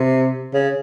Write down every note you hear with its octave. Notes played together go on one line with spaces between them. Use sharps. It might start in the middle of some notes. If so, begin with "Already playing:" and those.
Already playing: C3
C#3